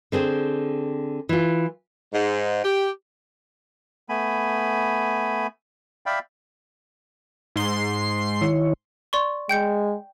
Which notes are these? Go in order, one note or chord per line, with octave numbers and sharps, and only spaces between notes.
D3 C4 G#4 C5
E3 F4
G#2
G4
A3 B3 G#5 B5
D5 E5 F5 G5 B5
G#2 C6 C7
D#3 E4 C#5
D5 C6 C#6
G#3 G5 G6 C#7